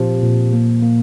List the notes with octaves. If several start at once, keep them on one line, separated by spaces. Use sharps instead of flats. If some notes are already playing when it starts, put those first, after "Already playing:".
Already playing: A#2 F3 C4 G4
A#2
A#3
A#3